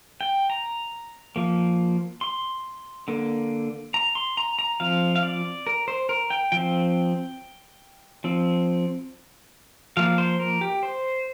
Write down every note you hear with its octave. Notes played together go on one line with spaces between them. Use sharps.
G5
A#5
F3 A#3
C6
D3 A#3
A#5
C6
A#5
A#5
F3 C4 F5
F5
D5
A#4
C5
A#4
G5
F3 C4 G5
F3 C4
F3 A#3 F5
C5
A#4
G4
C5